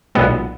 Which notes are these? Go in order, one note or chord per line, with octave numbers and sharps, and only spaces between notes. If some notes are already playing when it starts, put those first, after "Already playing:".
B1 A#2 G#3 B3